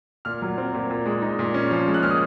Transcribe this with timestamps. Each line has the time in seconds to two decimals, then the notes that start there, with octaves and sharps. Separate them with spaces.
0.25 A#2 F6
0.42 F#3
0.58 C4
0.74 A#2
0.91 A#2
1.06 G#3
1.22 D#4
1.39 A#2
1.54 C#4
1.71 F3
1.87 G#3
1.94 F#6
2.03 A#2 F6
2.11 D#6